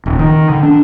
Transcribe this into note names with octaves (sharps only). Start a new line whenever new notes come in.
D#1
D#3
D3
D4